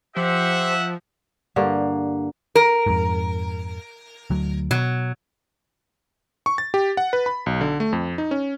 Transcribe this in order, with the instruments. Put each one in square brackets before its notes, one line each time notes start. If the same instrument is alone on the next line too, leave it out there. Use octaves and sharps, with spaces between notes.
[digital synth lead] F3 [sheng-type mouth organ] G4 C5 [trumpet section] E5 F#5
[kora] G2 D3 A#3
[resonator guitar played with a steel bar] A#4
[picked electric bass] F2 G#2
D2 F#3
[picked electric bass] B2 [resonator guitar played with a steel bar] F#3
[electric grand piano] C#6
A6
G4
F#5
B4
B5
B1
D3
A3
F2
D#4
C#4